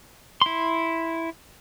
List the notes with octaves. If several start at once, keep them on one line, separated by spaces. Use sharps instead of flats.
E4 C6